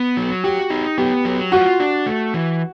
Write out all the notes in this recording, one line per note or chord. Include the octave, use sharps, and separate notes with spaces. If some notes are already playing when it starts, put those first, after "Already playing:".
Already playing: B3
F#3
F#4 G4
D#4
B3 G4
F#3
F4 F#4
D4
A3
E3